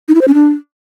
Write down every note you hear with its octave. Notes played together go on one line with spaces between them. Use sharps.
D#4
E4
C5
C#4
D4